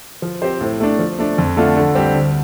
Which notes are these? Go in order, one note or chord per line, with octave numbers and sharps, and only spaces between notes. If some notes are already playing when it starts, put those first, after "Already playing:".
F3
C4 G4 C5
A2
A3 D4
F3
A3 D4
F2
D3 A3 D4 F4
D3
G3 C4 G4
D2